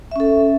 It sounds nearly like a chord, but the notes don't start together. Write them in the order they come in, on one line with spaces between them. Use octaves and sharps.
E5 C#4 A4